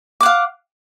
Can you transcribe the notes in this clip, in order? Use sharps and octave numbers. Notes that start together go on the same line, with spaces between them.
F5 F#5 D6